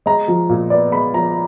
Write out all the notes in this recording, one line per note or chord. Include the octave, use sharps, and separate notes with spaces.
G#3 A#5
F3
A#2
B3 D5
G#3 B5
F3 A#5